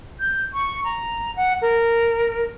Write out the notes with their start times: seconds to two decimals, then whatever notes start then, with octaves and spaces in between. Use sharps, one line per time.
0.20 G6
0.54 C#6
0.84 A#5
1.36 F#5
1.62 A#4